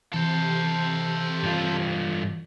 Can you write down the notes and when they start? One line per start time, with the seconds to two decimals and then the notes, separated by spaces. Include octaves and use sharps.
0.14 C3 E3 A4 C5
1.43 G2 F4